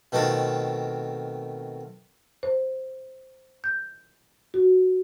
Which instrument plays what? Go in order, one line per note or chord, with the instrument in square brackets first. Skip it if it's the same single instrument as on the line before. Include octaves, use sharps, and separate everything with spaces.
[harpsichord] B2 D#3 A3 C4 F4
[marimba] C5
G6
F#4